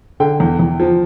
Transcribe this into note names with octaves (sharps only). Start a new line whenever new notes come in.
D3 G5
E2
E2
F3